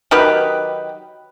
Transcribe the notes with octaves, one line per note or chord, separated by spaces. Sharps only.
D#3 F#3 G4 B4